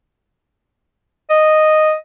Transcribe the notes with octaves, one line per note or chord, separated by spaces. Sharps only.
D#5